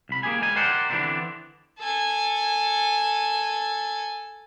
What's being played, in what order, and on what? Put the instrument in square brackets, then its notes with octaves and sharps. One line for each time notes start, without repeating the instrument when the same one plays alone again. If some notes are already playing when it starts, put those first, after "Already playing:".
[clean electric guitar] C2 B5
A#3 C4 G4 G#4 G#5
G3 G#3 G#5
G4 A#4 C5 D5 F#5
D3 E3 A3 B3 C4 D4
[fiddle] A4 G#5